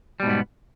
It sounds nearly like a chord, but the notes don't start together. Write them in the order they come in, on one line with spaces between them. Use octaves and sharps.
G3 B2 G#2 B3